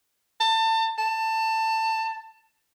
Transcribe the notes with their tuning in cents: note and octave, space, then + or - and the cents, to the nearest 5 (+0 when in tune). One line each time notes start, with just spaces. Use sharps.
A5 +30
A5 +20